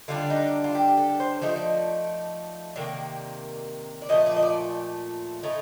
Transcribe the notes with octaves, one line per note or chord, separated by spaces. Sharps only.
D3 G3 D4 F4
D#4
F4
G4
A4
C5
F3 A3 D#4 D5
C5
D5
C3 D#3 A#3 D5
D5
A#2 F3 A3 D#5
D5
D#5
D5
A2 A3 D#4